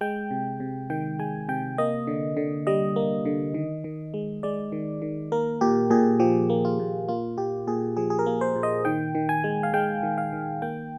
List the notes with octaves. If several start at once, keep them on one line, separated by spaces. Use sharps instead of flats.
G#3 G5
C3
C3
D#3 G5
G#3 G#5
C3 G5
A#3 D#5
D3
D3
G3 D#5
A#3
D3
D#3
D#3
G#3
G#3 D5
D#3
D#3
A#3 A#4
A#2 G4
A#2 G#4
F3 G4
A#3
F4
A#2
A#3 F4
A#2 G4
A#2 G#4
F3 G#4
G#4
A#4
A#3
C5
A#2
D#5
D#3 G5
D#3
G#5
G#3
F5
G#3 G5
D#3
F5
D#3
A#3 G5